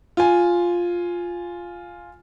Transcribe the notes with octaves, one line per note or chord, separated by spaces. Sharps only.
F4 G#5